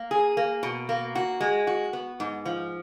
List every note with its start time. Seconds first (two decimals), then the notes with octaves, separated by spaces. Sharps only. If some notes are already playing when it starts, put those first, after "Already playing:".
Already playing: A#3
0.11 G#4
0.37 A#3
0.63 B2
0.89 A#3
1.15 F#4
1.41 G#3
1.67 F#4
1.93 B3
2.20 G#2
2.45 F3